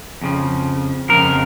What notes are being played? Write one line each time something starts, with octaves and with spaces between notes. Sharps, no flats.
F2 C#3 F3
F2 C#3 F3 A#4